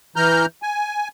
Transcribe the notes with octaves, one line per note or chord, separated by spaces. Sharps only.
E3 A#5 F6 G6
G#5